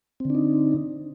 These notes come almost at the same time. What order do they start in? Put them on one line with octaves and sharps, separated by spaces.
C4 D3 D4 D#4